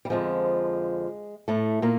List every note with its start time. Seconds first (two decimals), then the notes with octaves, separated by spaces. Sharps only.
0.05 G3
0.10 F2 D3 F3 G#3
1.48 A2 A3
1.82 A#2 A#3